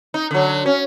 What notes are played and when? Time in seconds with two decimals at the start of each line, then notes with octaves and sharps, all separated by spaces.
0.14 D#4
0.31 D3 F#3
0.66 C#4